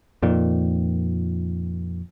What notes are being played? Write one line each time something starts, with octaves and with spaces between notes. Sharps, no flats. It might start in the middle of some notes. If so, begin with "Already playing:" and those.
F2 A#2 D#3